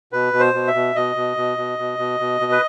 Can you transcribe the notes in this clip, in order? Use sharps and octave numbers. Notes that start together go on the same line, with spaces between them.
B2 B4
B2
C5
B2
E5
B2
B2 D#5
B2
B2
B2
B2
B2
B2
B2
B4